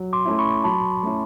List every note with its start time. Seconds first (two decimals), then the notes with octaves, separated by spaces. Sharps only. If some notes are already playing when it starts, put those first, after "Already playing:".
Already playing: F#3
0.13 C6 D6
0.25 A3 C#4 E4
0.39 B5 C#6
0.64 F#3 A5 B5
1.03 A3 C#4 E4